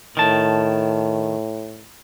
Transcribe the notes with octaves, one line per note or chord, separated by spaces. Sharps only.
A2 D#3 A5